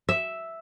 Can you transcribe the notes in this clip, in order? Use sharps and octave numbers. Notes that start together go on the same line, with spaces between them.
E5